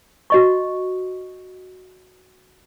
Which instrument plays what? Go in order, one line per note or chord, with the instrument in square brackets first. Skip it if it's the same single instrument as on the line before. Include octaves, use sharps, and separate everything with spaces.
[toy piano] F#4 D#5 C#6